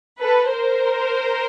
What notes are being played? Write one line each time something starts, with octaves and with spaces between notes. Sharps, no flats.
A4 B4
A#4 C5